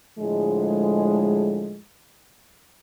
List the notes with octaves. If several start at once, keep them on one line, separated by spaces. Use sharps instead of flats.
A2 D3 F3 G#3